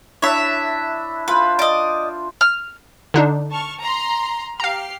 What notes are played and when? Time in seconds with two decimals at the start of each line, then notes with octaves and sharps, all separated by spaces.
0.22 D4 E4 C#5 E5
1.28 F4 B4 C5
1.59 D5 D#5
2.41 F6
3.14 D3 D4 D#4
3.50 A5 C#6 F6
3.83 A#5 C6
4.60 G4 F5 A#5 F6 C7